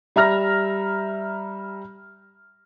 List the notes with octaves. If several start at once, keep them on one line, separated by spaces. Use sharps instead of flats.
G3 E5 A#5 F6 A#6